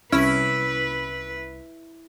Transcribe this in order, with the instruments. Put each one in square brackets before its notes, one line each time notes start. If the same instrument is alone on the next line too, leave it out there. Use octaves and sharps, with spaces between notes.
[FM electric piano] C2 [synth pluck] C#4 [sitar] E4 [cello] B4